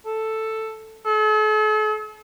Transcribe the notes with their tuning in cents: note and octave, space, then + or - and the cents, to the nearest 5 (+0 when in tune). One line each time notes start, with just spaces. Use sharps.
A4 +5
A4 -45